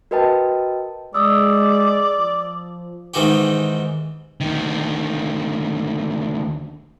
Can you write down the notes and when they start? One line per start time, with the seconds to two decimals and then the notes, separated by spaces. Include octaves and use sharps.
0.11 F#4 A#4 B4 D#5 G5 A5
1.14 G#3 D5 D#6 E6
2.18 F3
3.14 G#2 D#3 E3 D#4 F#4 G4
4.41 D2 D#3